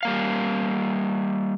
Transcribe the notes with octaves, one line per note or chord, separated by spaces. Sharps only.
G3 A#3 F5